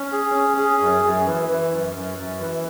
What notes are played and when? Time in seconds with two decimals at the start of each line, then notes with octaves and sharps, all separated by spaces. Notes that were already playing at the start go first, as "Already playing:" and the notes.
Already playing: C#4
0.12 G#4
0.35 C#4
0.57 G#4
0.80 F#2
1.04 F#2
1.26 E3
1.49 E3
1.72 F#2
1.95 F#2
2.18 F#2
2.40 E3